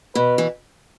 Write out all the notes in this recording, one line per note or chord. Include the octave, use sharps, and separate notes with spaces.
B2 B4
E3